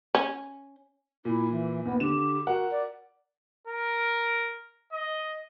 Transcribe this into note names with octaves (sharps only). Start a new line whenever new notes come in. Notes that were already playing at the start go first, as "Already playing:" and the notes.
C#4
A#2 E4
E3
D#2 B3
D3 G4 E7
F#4 A#4 F#5
D5
A#4
D#5